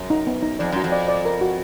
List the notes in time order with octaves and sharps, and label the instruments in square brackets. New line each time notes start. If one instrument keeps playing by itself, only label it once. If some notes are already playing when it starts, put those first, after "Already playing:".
Already playing: [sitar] F#2
[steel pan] D#4
B3
D#4
[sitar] F2 [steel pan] D5
[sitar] F#2 [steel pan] F#4
[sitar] F2
[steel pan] D5
D5
A#4
F#4